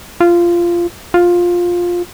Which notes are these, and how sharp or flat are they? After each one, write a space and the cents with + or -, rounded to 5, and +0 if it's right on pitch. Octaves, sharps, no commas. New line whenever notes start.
F4 -15
F4 +10